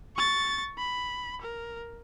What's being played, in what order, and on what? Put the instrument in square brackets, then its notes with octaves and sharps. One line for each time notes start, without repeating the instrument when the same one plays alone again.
[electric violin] C#6 A6
B5
A#4